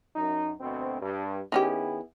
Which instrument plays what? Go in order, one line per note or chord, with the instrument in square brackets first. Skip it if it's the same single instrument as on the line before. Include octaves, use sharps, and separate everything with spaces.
[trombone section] F#2 D#4
D2 B2 C4
G2
[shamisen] D#3 C#4 G4 [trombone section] B3 E4 G#4